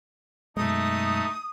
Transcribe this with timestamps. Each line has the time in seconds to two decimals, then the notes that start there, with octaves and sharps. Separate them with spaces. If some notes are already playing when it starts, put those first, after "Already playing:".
0.57 F#2 B2 G#3 A3 D#4 D#6